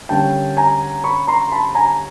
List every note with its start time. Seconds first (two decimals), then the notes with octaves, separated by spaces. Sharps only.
0.09 D3 G3 A#3 C#4 G5 A5
0.57 G#5 A#5
1.04 B5 C#6
1.27 A#5 C6
1.52 A5 B5
1.75 G#5 A#5